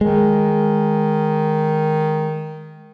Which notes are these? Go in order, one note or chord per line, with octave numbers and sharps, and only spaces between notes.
D#3 G#3